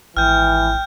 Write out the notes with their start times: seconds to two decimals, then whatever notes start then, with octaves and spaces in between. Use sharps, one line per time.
0.17 G#1 E3 G5 F6 G6